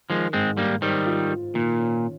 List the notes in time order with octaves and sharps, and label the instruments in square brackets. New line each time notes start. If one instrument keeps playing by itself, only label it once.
[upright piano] D#3 [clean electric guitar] F3 G#3
[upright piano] G#2 [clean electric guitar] G#3 C4
[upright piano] G#2 [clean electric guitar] G3 A#3
[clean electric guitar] D#3 G3 [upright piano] C5
[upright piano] F4
F4
[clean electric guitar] A#2 [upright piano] D#3
[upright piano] C#4